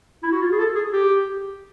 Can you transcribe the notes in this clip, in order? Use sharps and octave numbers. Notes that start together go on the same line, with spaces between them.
E4
F#4
F4
G#4
A4
G#4
G4